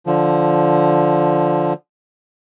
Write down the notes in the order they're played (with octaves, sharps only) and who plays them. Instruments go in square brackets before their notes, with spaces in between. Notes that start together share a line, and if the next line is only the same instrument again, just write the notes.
[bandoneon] D3 F3